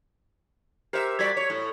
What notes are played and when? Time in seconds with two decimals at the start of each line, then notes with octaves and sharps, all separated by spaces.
0.93 G4 A#4 C5 E5
1.19 G3 F#4 D5 G#6 B6
1.37 C#5
1.50 A2